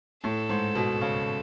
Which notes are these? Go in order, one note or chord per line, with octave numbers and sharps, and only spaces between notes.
A2 A4
G#2
B2
C#3